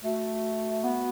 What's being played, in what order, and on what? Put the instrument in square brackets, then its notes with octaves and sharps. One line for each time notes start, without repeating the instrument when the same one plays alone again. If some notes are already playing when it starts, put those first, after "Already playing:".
[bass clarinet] A3 [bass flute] F#4
[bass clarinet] B3